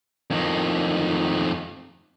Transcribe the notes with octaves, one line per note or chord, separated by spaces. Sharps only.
F2 D#3